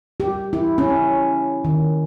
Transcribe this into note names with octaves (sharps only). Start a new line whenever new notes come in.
G4
E4
C#4
D#3